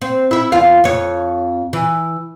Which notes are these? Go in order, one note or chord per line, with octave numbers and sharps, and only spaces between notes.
C4
E4 E5
E2 F4 F5
F2 C#5
E3